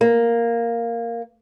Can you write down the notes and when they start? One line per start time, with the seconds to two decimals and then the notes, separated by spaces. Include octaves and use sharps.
0.01 A#3